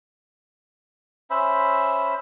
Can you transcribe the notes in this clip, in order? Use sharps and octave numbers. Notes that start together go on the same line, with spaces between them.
C#4 C5 E5 B5